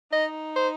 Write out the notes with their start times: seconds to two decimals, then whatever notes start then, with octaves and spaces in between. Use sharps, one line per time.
0.12 D#4 D#5
0.56 C5